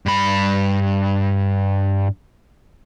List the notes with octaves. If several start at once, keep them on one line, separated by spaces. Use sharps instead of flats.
G2 B5